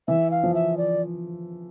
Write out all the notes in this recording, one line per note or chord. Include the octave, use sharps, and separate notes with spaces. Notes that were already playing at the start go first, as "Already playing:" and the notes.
E3 E5
F5
F3
E5
D5